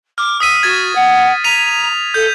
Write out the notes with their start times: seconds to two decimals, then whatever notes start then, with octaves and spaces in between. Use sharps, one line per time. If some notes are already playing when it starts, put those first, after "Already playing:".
0.18 D6 F6
0.40 D#6 E6 B6 D#7
0.63 F#4 G#6 A6
0.95 F#5
1.44 A#5 B6 D#7 F7
2.14 A4 G6